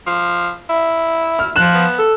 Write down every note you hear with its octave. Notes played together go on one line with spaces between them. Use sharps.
F3
E4
F6
F3 F#6 E7
B3
A4